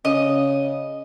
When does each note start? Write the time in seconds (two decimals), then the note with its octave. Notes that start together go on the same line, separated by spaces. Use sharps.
0.05 C#3 D#5